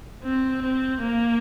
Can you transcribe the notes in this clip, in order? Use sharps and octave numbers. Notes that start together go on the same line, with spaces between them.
C4
C4
A#3